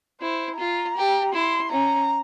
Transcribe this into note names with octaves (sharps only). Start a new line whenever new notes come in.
E4 C5
F4 A#5
G4
E4 C6
C#4 A#5